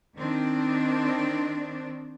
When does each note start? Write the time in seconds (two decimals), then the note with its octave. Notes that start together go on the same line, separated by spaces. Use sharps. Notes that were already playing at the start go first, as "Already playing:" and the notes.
0.16 D#3 C4 D4